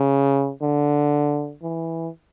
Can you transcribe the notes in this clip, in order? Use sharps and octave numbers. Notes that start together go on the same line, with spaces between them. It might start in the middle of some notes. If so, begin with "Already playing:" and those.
Already playing: C#3
D3
E3